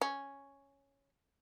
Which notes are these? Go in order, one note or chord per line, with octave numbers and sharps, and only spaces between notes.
C#4